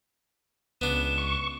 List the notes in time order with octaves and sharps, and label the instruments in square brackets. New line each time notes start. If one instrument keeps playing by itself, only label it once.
[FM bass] C#2 [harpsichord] B3 D4 [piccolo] E7
[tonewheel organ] C#6